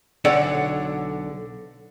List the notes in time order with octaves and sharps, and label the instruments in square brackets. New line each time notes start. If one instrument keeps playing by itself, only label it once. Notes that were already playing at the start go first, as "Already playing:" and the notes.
[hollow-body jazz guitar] B1 D3 A4 C#5 D5 F#5